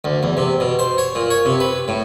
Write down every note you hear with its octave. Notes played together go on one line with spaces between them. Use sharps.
D2
E2
C3
B2
C5
C#5
A#2
C#5
C3
B4
A2